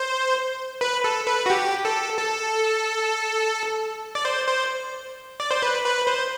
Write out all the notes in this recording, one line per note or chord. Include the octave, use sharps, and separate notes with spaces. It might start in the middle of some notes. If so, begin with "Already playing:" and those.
Already playing: C5
B4
A4
B4
F#4
G4
A4
A4
D5
C5
C5
D5
C5
B4
B4
C5